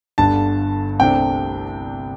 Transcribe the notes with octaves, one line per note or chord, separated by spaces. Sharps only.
G1 G2 D3 A5
C2 C3 A3 D4 G5